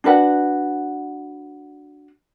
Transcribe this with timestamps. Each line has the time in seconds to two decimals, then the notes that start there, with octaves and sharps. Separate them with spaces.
0.04 D4 F#4 B4 F#5